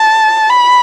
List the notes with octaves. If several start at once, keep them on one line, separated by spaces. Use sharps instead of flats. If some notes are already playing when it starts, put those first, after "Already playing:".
Already playing: A5
B5